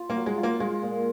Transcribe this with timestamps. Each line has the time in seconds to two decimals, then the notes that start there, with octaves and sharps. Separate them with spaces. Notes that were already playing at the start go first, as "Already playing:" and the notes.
Already playing: F4
0.10 A#3
0.15 F#3
0.26 G#3
0.38 F4
0.43 A#3
0.60 G#3 F4
0.82 A#2